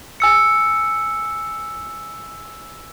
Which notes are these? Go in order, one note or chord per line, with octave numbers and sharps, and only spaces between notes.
G#5 E6 C#7